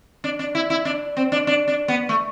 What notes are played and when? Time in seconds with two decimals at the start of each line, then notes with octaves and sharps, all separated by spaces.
0.24 D4
0.39 D4
0.55 E4
0.70 E4
0.85 D4
1.17 C4
1.32 D4
1.47 D4
1.68 D4
1.88 B3
2.09 A3